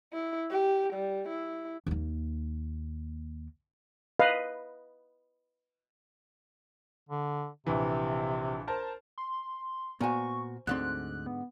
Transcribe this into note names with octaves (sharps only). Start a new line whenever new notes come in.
E4
G4
G3
E4
D#2 A#3
B4 D#5 F5
D3
A#1 C3 E3
A#4 C5 A5
C6
A#2 B3 F#4 C5 G#5 A#5 C#6
D2 G#2 D3 C4 C6 F#6
B3